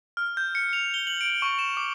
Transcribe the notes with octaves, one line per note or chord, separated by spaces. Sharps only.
F6
G6
C#7
F7
G7
F#7
D7
C#6
E7
D6